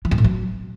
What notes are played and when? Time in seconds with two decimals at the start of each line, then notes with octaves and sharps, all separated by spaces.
0.05 E3
0.11 F#2
0.18 A2
0.24 F#3